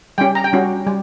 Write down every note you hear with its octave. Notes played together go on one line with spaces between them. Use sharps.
G3 C#4 G4 G5
A#5
G5
G3 C#4 F#4
G3